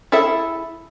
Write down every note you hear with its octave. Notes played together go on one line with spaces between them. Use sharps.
E4 G#4 A4 E5